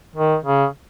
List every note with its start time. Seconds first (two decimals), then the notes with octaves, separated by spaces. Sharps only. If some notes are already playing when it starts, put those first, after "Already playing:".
0.16 D#3
0.45 C#3